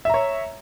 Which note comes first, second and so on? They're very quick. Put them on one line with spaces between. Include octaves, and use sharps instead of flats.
E5 A#5 C#5